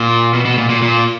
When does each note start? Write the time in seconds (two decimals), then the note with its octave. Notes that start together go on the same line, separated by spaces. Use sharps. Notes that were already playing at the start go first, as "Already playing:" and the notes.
Already playing: A#2
0.34 B2
0.45 B2
0.58 A#2
0.70 A#2
0.82 A#2